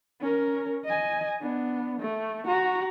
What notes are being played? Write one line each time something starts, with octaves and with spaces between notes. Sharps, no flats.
C#4 A#4
D#5 G#5
B3 D4
A3
F#4 A#5